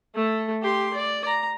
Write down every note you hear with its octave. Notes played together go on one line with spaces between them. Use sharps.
A3 A4
G4 C6
D5
A#5